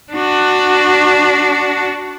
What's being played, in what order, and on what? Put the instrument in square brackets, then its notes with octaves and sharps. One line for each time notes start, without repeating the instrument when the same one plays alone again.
[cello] D4 F#4